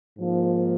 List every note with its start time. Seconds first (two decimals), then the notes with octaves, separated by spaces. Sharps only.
0.19 G#2 F3 A#3